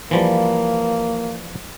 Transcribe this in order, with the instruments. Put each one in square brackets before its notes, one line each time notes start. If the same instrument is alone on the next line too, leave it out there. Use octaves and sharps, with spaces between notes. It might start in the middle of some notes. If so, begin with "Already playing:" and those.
[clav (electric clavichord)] E3 F3 G3 [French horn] A#3